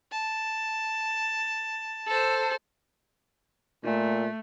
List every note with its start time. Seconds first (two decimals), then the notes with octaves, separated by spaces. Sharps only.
0.12 A5
2.07 A4 C5
3.85 A#2 A3